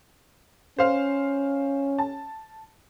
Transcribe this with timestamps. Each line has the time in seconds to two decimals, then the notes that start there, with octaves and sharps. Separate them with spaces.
0.79 C#4 C5 F5
1.99 A5